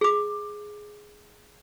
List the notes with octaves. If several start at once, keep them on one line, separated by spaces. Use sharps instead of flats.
G#4 D6